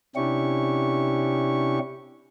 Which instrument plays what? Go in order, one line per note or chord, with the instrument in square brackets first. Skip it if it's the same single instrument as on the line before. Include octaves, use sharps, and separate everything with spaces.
[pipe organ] C3 C#4 D4 E4 G4 C#6